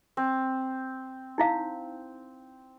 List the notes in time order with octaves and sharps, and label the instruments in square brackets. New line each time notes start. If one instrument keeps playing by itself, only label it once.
[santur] C4
[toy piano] D#4 E4 F5